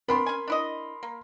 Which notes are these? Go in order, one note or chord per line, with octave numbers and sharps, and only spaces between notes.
B3 D4 G4 A#4 B5 C6
C#4 G#5
D4 E4 D#5
A#3